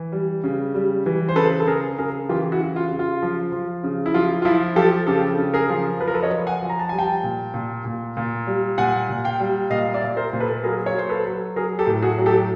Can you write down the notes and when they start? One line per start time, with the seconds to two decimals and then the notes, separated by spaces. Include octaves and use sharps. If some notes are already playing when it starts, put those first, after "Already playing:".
Already playing: E3
0.12 G3
0.44 C#3
0.75 G3
1.06 E3
1.29 C5
1.36 C#3 A4 B4
1.60 A4
1.67 C#3 G#4 A#4
1.98 C#3 G#4 A#4
2.29 E3 F4 G4
2.52 E4 F#4
2.60 C#3
2.76 F4
2.91 C#3
2.99 F4
3.22 F3
3.52 F3
3.83 C#3
4.06 E4
4.14 F3 F4
4.42 F4
4.45 F3 E4
4.76 F3 G4 A4
5.07 C#3 G4 A4
5.38 C#3
5.54 G#4 A#4
5.69 F3
6.00 F3 B4
6.08 A#4
6.14 A4 B4
6.23 C#5 D#5
6.31 F3
6.47 F#5 G#5
6.62 F3
6.70 A#5
6.79 A5
6.89 G3 G#5
6.98 G5 A5
7.23 A#2
7.54 A#2
7.85 A#2
8.17 A#2
8.47 G3
8.78 A#2 F#5 G#5
9.09 A#2
9.24 F5 G5
9.40 G3
9.70 A#2 D#5 F5
9.94 D5 E5
10.02 A#2
10.17 A#4 C5
10.33 A#2
10.40 A4 B4
10.64 F#3 G#4 A#4
10.86 C#5
10.94 F#3 C5
11.09 A4 B4
11.25 F#3
11.56 F#3 G#4 A#4
11.79 G4 A4
11.87 A2
12.02 F#4 G#4
12.18 F#3
12.26 G4 A4